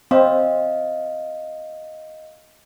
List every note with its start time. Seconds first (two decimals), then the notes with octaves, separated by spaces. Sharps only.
0.11 C4 D#5 F5